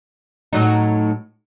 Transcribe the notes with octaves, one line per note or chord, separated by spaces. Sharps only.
A2 F#3 D#4